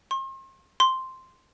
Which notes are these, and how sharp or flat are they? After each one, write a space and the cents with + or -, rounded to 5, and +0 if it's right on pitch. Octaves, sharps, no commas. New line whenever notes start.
C6 +40
C6 +0